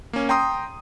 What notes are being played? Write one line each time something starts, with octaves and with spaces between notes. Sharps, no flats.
A#3 C#4
G5 A#5 C6 D#6